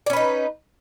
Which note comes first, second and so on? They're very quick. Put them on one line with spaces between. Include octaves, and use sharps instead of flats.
D5 C#4 B4 D#4